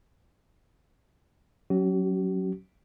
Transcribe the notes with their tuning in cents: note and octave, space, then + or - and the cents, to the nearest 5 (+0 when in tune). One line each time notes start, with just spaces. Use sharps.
F#3 +0 C#4 +0 F#4 +45